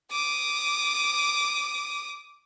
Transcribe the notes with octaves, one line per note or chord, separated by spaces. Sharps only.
D6 D#6